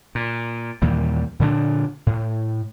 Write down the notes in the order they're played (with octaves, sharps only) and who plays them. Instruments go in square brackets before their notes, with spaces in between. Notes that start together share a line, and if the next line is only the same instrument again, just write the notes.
[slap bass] A#2
D#2 A#2 E3 G3
A#2 D3 C4 D4
A2